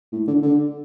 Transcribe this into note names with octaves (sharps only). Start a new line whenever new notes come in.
A2
D3
D3